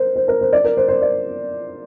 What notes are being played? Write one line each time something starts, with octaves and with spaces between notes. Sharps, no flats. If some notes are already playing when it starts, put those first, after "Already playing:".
Already playing: A#4 C5
C5
A#4
C5
D5
A#4
C5
C5
D5